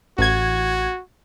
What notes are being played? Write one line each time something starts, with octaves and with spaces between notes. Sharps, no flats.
A1 F#4 G#6